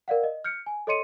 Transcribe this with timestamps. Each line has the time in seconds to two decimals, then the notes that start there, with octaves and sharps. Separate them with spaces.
0.08 A#4 D5 F5 F#5
0.24 D#5
0.44 F6 G6 C#7
0.66 G#5
0.87 A4 C#5 D#5 C6 C#7 D#7